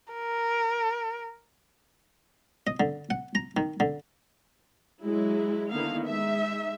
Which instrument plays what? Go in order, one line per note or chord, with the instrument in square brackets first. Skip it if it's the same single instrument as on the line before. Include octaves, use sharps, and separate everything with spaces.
[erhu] A#4
[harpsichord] D#5
D3
F#5
A#5
D#3
D3
[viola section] F#3 G#3 E4
D3 D#3 A#3 B3 E4 F5
G#3 D#4 E5